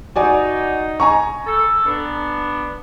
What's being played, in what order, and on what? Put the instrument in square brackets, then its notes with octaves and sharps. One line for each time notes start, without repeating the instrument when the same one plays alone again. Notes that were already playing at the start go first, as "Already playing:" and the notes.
[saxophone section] D#4 [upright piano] F#4 D5 G#5
[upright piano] G#5 A#5 C#6
[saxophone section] A4
B3 D4